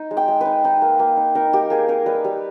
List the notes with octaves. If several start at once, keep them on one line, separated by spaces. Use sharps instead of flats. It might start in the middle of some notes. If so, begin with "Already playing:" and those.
Already playing: D#4
G#3
G5
G#3
B4
D#4
D#4
A#3
A#3
D#4
D#4 A#4
A#3 G4
A#3 G#4
D#4 A#4
G3 B4
G3